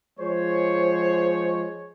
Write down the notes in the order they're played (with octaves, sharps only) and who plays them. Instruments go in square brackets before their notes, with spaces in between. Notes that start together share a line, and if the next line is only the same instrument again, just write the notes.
[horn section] F3 G#3 C#5 [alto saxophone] C5